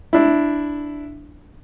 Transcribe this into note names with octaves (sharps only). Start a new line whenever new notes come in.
D4 E4